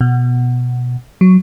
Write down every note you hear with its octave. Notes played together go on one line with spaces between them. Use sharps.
B2
F#3